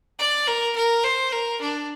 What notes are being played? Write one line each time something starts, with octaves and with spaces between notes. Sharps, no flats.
D5
A#4
A#4
C5
A#4
D4